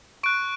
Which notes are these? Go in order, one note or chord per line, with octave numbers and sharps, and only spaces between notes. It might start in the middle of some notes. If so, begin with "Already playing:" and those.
C#6 F#6 D7